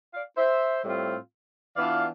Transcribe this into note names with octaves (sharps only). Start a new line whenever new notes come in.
D5 F5
C5 E5
A2 G3 C4 F4
E3 B3 D4 F4 D5 F5